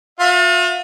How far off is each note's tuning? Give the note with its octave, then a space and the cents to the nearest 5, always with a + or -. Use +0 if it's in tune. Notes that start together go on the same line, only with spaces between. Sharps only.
F4 +45 E5 +45